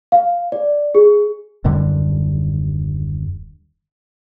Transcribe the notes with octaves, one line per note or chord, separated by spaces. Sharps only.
F5
D5
G#4
D#1 F#2 D3 G3